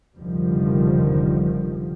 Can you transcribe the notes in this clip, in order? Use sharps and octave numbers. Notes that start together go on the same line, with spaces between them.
F1 C#2 D3 D#3 F3 G3